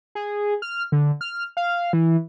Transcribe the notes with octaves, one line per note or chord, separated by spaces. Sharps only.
G#4
F6
D3
F6
F5
E3